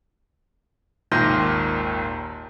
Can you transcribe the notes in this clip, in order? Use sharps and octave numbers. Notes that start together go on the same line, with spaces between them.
G#1 D#2 A#2 C6 G6 A#6